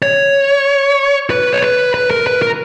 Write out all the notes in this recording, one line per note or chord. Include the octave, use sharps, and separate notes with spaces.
C#5
B4
C#5
B4
B4
A#4
B4
A#4